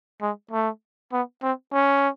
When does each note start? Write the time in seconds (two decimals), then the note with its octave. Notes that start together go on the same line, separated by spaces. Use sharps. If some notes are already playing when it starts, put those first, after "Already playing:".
0.22 G#3
0.51 A3
1.12 B3
1.43 C4
1.72 C#4